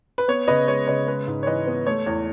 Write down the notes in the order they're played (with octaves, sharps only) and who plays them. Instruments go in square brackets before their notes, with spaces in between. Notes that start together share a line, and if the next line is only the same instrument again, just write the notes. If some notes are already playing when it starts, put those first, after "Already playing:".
[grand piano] B4
B3 C#5
C#3 B4 D#5
G#3 C#5
C#3 B4 D#5
G#3 B4
G#2
C#5
E3 B4 D#5
B3
A3 C#5
E2 C#5